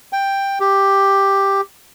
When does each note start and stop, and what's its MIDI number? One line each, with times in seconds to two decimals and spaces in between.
0.13 0.59 79
0.60 1.61 67